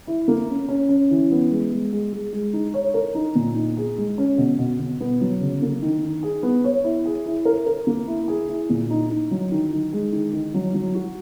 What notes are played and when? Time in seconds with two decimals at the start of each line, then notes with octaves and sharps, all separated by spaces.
0.07 E4
0.28 A#3
0.49 C#4
0.69 C#4
0.89 C#4
1.11 E3
1.31 B3
1.51 G#3
1.72 G#3
1.93 G#3
2.12 G#3
2.33 G#3
2.53 D#4
2.74 C#5
2.94 A#4
3.15 D#4
3.35 A#2
3.56 D#4
3.77 G#4
3.98 G#3
4.18 C#4
4.38 B2
4.59 B2
4.79 B2
5.00 B3
5.21 F#3
5.41 C#3
5.62 A#3
5.82 D#3
6.03 D#3
6.23 G#4
6.43 B3
6.64 C#5
6.84 E4
7.06 G#4
7.26 E4
7.45 A#4
7.66 A#4
7.87 A#3
8.08 E4
8.28 G#4
8.48 E4
8.70 A#2
8.90 D#4
9.10 D#4
9.31 F#3
9.51 D#3
9.72 D#3
9.93 G#3
10.12 D#3
10.33 D#3
10.54 F#3
10.74 F#3
10.95 F#4